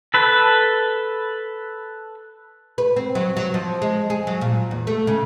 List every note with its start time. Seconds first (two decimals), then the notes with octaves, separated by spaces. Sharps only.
0.14 A4 B4
2.78 B4
2.96 C4
3.15 F#3
3.37 F#3
3.54 F3
3.82 G#3
4.10 G#4
4.27 F#3
4.41 A#2
4.71 E2
4.87 A3
5.07 C#3